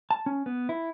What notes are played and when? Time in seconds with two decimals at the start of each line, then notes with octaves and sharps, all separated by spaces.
0.11 A5
0.26 C#4
0.46 B3
0.69 E4